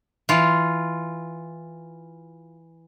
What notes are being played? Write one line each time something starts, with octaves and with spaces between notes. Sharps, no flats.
E3 F4